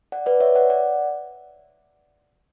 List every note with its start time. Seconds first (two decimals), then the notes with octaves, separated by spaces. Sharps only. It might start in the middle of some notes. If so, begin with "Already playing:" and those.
0.12 D5 F#5
0.26 B4 D5
0.40 C#5 E5
0.55 D5 F#5
0.70 D5 F#5